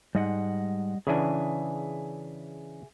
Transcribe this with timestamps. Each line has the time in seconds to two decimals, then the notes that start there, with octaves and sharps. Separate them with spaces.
0.15 G#2 G3 D#5 F#5
1.07 C#3 E3 D4 G#4 E5 G#5